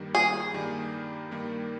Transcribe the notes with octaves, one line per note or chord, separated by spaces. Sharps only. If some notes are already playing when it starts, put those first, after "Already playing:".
Already playing: G2 D#3 G3 A#3
G#4
G2 D#3 G3 A#3
G2 D#3 G3 A#3